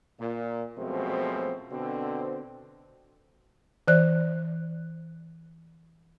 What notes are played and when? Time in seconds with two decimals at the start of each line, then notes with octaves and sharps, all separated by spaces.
0.20 A#2
0.78 F#2 B2 F3 G#3 A3 C4
1.71 B2 D3 C4
3.88 E3 C5 D5 F#6